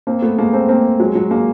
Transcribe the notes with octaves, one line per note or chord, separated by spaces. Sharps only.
A#3 C4
A3 B3
G#3 A#3
A#3 C4
A#3 C4
F#3 G#3
F#3 G#3
G#3 A#3